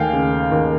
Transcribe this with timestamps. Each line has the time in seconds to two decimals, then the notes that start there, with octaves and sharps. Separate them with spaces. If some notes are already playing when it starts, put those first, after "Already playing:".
Already playing: D#2 A3 F5 G5 G#5
0.13 C#3
0.52 D#2